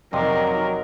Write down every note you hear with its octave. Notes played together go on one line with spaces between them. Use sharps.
F2 C3 F#3 D#4 A#4 C5 D5 D#5